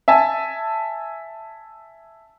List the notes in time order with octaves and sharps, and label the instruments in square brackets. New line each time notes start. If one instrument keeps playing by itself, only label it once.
[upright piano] E5 G#5 A5